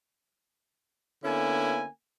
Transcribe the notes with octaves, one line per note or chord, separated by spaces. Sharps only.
D3 A#3 B3 C#4 E4 G#5